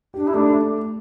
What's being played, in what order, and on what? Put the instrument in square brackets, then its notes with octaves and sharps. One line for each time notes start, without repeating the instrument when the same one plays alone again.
[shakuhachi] D4 [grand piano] G4
[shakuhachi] E4
[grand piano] A3 [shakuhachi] D4